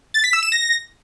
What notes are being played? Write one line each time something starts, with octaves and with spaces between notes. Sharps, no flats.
A6
B6
E6
E7
A#6